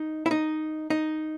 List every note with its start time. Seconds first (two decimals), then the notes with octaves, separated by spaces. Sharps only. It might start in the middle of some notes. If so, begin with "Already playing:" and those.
Already playing: D#4
0.26 E4
0.31 D#4
0.90 D#4